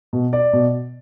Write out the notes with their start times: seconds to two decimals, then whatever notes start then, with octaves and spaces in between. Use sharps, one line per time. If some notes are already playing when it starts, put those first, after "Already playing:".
0.13 B2
0.33 D5
0.53 B2